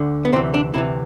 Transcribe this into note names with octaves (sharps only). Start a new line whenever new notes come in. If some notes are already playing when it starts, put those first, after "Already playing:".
Already playing: D2 D3
B3
D2 C3 E3 C4
D4
D2 C3 E3 E4